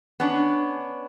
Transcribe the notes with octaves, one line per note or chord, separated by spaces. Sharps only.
B3 C#4 D4